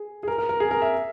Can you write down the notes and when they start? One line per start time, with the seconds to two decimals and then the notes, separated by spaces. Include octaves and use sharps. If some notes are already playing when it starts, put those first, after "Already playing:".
Already playing: G#4
0.23 G#4
0.28 A#4
0.38 A#4
0.49 A#4
0.60 G#4
0.71 A#4
0.82 E5